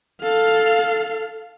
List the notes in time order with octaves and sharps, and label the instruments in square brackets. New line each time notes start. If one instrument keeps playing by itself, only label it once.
[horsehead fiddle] A4 F5